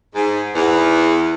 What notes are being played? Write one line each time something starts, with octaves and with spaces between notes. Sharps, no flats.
G#2
E2